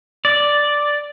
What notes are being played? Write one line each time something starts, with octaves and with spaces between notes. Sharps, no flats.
D5